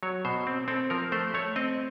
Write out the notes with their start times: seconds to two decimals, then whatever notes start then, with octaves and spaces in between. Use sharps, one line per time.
0.03 F#3 C#5
0.25 B2 C5
0.47 C4
0.68 C4 A4
0.90 F3 A#4
1.12 A3 C5
1.34 A3 C#5
1.56 C4 D#5